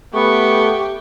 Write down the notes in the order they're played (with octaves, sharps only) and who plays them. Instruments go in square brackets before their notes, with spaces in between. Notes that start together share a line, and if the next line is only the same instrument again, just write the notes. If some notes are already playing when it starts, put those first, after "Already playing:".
[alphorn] A3 [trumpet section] B3 [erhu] G4 [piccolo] C#6